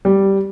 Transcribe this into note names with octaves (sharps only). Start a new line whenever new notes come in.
G3